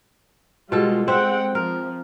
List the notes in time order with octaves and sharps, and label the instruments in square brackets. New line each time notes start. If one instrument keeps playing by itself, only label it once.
[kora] B2 A4 [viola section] G3 G#3 F4
[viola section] G#3 F#5 G5 [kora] C4 E5
[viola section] F3 [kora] A#4